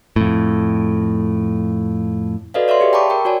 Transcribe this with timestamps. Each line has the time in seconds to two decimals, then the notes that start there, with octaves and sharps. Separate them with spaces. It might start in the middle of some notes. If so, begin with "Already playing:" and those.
0.16 F2 A2
2.54 F#4 A4 B4 D5 D#5 F5
2.68 C#5 D5 E5 F5 C6
2.81 G4 G#4 E5
2.93 G5 A5 B5 C#6 D6
3.10 A#4 G5
3.25 F#4 C#5 D5 G#5